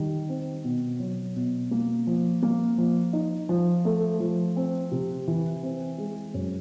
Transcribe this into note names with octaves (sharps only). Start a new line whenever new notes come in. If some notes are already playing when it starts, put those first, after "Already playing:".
Already playing: D#3 G3
C4
B2
F#3
B2
A#3
F3
A#3
F3
D#4
F3
A3
F3
C4
C3
E3
C4
G#3
F#2